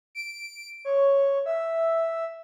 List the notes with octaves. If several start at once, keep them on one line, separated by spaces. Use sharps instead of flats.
D7
C#5
E5